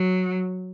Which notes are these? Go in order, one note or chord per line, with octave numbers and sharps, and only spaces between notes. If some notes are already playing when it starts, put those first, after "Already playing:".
Already playing: F#3